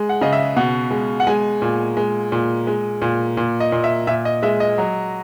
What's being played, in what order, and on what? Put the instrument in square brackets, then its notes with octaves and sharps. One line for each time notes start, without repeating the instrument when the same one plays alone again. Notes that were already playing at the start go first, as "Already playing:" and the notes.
Already playing: [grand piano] G#3
F#5
C#3 D#5
E5
B2 F#5
G#3
F#5
G#3 G#5
A#2
G#3
A#2
G#3
A#2
A#2
D#5
A#2
E5
A#2 E5
D#5
G#3 E5
D#5
F#3